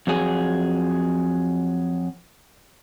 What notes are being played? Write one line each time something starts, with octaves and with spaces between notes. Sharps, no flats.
F2 F#3 G#4